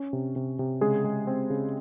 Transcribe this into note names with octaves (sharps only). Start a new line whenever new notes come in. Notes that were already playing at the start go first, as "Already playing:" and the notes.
Already playing: C#4
C3
C3
C3
C#3 G#3 G#4
G#3
C4
C#3